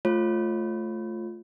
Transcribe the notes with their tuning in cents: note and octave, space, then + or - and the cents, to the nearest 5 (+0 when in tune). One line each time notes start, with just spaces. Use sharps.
A3 -10 F4 +0 C#5 -45